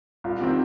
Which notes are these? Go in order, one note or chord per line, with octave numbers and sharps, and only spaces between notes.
C2 F4
C3 D#3 C4